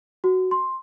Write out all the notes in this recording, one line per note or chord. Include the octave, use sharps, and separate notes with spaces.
F#4
C6